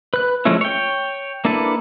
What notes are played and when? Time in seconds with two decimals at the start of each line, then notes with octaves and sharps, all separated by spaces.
0.14 B4 F#6
0.45 F3 G#3 A3 C#4 E4
0.61 C#5 G5
1.45 A#3 D4 E4 A4 B4